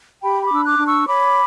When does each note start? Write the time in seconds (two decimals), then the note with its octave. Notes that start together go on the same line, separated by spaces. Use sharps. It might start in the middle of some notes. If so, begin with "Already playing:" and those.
0.22 G4 G5 B5
0.43 B5 D6
0.50 D4 E6
0.64 D6 F#6
0.78 D4
0.86 C#6 E6
1.06 C#5 B5 D6